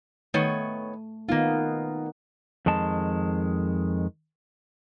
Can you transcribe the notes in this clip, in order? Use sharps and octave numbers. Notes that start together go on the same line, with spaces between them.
D#3 A3 B3 C#5
D#3 A#3 B3 D#4 F4
F2 D#3 G#3 A5